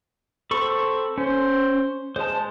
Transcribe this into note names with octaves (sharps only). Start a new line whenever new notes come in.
C4 A4 B5 C#6
C#4 C5
G#3 C5 A5